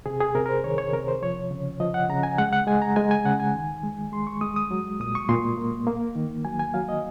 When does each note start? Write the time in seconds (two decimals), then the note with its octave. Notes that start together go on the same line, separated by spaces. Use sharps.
0.06 C3 G#4
0.21 G#4
0.35 C3 A#4
0.46 A#4
0.49 C5
0.64 D#3 C#5
0.78 C#5
0.93 C3 A#4
1.08 C5
1.22 F3 C#5
1.51 C#3
1.80 F3 D#5
1.94 F#5
2.09 C#3 A#5
2.23 G#5
2.38 G#3 F#5
2.53 F#5
2.67 G#3 G#5
2.82 A#5
2.96 G#3 G#5
3.11 G#5
3.25 C#3 F#5
3.40 G#5
3.55 D#3
3.83 G#3
4.12 G#3 C6
4.27 C#6
4.41 G#3 D#6
4.56 D#6
4.71 F#3
5.00 A#2 D#6
5.15 C#6
5.29 A#2 C6
5.58 A#3
5.87 A#3
6.15 D#3
6.45 F#3 G#5
6.59 G#5
6.74 F#3 F5
6.89 D#5